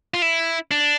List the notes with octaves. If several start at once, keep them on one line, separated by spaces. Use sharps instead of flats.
F4
E4
D4